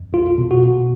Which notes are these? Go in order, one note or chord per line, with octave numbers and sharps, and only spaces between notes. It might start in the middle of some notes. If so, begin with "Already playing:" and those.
Already playing: F2
B1 F4
B2
F#4
B2